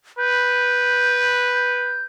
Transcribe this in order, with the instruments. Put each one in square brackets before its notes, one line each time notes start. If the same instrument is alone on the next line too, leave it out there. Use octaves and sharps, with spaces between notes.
[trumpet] B4 [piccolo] G6